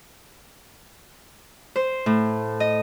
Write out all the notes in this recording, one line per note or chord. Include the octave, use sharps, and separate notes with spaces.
C5
A2
D#5